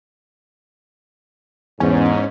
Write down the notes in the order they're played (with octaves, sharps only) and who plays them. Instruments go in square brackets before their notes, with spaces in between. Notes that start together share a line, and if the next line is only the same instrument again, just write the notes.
[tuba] E2 [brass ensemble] G#2 [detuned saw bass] C#4